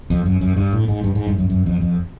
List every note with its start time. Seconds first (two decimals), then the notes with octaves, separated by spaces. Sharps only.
0.10 F2
0.26 F#2
0.41 F#2
0.56 G2
0.73 A2
0.88 G#2
1.04 G2
1.15 G#2
1.27 G2
1.38 F#2
1.50 F#2
1.66 F2
1.81 F2